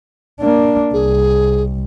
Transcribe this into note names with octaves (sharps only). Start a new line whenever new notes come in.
A#3 D4
C2 G#4